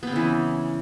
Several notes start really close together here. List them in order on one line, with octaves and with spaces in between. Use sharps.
B3 C4 C#3 E3